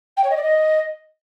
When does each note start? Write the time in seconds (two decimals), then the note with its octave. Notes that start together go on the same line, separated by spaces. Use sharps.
0.17 G5
0.23 C#5
0.30 D#5
0.36 D5
0.43 D#5